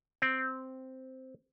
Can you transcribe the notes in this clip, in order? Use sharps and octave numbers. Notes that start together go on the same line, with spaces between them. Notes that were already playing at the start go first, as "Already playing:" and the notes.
C4